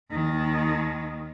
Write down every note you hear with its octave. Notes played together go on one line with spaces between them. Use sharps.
D#2 D#3